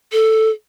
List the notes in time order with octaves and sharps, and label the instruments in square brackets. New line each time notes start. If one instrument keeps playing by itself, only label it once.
[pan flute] A4